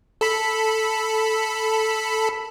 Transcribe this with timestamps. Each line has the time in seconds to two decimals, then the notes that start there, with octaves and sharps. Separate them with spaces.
0.21 A4 B5